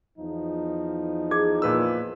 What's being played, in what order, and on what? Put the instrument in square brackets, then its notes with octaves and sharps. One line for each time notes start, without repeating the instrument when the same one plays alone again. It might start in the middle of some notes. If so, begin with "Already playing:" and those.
[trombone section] E2 F3 D#4
[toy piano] G#4 [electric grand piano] G#6
[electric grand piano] A#2 B4 E6